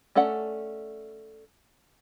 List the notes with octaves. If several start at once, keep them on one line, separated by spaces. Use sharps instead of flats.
A3 C#4 A4 D5 F#5